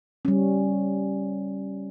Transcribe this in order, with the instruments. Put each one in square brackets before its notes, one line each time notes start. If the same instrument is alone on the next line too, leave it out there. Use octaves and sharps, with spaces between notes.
[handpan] G3 C#4